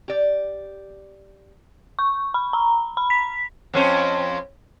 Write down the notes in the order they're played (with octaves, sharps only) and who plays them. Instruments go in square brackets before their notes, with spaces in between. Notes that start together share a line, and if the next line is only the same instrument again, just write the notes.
[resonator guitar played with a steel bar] G4 D5
[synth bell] C#6
B5
A#5
B5
B6
[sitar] F2 C#4 C5